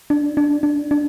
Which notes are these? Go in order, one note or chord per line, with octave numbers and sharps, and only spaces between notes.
D4
D4
D4
D4